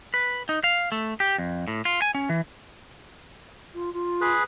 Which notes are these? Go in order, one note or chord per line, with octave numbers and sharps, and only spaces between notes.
B4
D#4
F5
A3
G4
F2
A2
F4
G#5
C#4
E3
F4
F4
G#4 B4